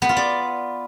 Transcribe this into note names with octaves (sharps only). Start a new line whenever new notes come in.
B3
F4
D5